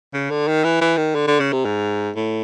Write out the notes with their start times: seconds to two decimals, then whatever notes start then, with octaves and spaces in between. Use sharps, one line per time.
0.14 C#3
0.31 D3
0.48 D#3
0.64 E3
0.81 E3
0.97 D#3
1.15 D3
1.27 D3
1.40 C#3
1.53 C3
1.65 G#2
2.16 A2